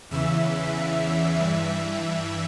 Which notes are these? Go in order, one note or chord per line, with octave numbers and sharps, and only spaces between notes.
E2 C#3 E3 E5
G2 E3